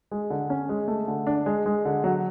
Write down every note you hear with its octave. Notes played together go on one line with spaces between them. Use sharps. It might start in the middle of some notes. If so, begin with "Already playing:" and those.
G#3
D3
C#4
G#3
A3
D3
D4
G#3
G#3
D3
F#3